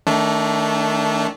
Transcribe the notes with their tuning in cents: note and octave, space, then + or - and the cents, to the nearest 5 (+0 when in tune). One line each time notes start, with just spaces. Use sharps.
D#3 +0 A3 +0 D4 -30